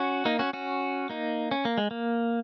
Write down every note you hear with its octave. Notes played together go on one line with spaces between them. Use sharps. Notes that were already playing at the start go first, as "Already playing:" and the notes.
Already playing: C#4 F#4
A#3 D#4
C#4 F#4
C#4 F#4
A#3 D#4
C#4
A#3
G#3
A#3